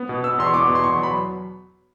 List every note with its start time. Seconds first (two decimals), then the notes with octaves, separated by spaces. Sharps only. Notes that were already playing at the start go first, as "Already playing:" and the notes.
Already playing: B3
0.09 B2
0.24 B3 E6
0.39 E2 C6
0.47 C#6
0.54 B3 D6
0.69 B2
0.75 C6
0.84 E2 C#6
0.99 F#3 B5